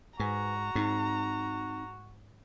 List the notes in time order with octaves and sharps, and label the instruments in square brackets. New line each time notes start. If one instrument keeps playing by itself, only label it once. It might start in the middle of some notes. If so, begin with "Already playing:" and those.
[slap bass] G#2 [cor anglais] F#4 [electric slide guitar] B4 G#5 [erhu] A#5
[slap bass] G#2 [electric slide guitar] C4 D#4